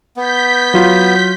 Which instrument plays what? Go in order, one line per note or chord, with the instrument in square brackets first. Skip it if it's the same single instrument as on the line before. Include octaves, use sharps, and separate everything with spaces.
[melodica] B3 [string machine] G6 B6
[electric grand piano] F#3 F4